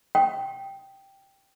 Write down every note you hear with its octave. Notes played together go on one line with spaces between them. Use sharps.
G5